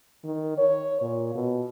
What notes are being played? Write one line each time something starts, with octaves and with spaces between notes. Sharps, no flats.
D#3
C#5
A#2
B2